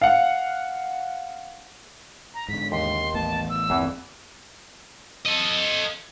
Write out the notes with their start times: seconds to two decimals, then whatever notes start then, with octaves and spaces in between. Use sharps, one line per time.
0.02 F5 F#5
2.34 A#5
2.49 G#2 D3 B6
2.72 D#2 C6
3.14 A1 A3 B3 A5
3.49 E6
3.70 G1 E2 A#2 E3 C4
5.26 A4 D#5